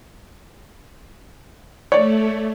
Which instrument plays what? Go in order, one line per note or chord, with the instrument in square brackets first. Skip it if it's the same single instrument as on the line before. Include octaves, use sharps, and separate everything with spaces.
[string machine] A3 [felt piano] C#5 D5